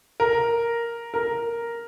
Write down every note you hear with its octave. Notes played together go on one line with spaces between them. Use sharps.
A#4
A#4